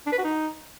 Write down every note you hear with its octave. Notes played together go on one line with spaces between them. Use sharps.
D4
B4
F#4
D#4